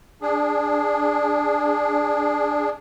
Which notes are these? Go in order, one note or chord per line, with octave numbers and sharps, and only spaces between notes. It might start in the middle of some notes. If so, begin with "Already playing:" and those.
D4 G#4